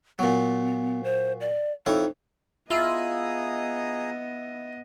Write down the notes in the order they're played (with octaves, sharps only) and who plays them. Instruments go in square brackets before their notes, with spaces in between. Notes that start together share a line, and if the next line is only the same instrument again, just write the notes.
[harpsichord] A#2 F#3 [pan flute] B3
[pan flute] C5
D5
[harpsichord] F2 E4 C#5 [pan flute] D#4
[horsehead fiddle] B3 D#5 [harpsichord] E4 [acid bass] F4 [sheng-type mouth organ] G#4 A#5 D#6